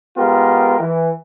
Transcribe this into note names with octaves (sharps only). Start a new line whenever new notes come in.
G#3 B3 F4 G4 A#4
E3